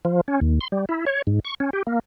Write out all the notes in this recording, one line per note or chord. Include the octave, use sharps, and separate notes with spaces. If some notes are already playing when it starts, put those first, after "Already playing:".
F3
C#4
D#2
C6
G3
E4
C#5
G#2
C#6
C#4
G4
A#3